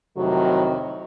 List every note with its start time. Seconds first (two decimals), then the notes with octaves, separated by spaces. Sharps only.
0.16 F2 A2 C3 D#3 F#3